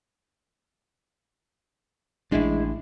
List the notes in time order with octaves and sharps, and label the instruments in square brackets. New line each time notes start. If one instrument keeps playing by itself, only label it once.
[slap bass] A1 D4 [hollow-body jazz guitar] G#3 E4